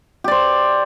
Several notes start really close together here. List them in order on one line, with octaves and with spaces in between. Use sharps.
G4 D5 C5